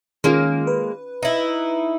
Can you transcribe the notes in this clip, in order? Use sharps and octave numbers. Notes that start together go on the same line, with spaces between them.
D#3 G#3 A#3 C#4 F4
B4
D#4 E4